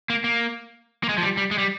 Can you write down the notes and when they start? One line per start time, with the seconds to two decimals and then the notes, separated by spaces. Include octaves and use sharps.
0.10 A#3
0.24 A#3
1.03 A#3
1.09 G#3
1.18 F3
1.23 G3
1.37 G3
1.51 G#3
1.58 G3